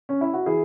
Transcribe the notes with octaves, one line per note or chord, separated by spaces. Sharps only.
C#4
E4
F#4
E3 E4 G#4